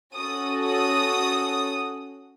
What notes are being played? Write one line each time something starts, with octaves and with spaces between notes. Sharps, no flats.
C#4 F#4 A4 D#6
D#6